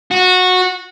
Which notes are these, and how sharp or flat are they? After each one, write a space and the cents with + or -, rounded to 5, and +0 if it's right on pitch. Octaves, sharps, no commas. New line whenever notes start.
F#4 -15